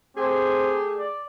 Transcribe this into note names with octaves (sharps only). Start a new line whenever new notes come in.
A3 C4 G4 G#4
D5